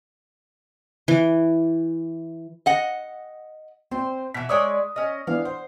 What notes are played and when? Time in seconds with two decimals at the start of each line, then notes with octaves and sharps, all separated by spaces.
1.08 E3
2.66 D#5 F#5
3.91 C4 C5
4.34 B2 E3 B6
4.49 G#3 C#5 D5 D#6 E6
4.96 C#4 D#5
5.27 E3 B3 D4 F5
5.45 C5 F#5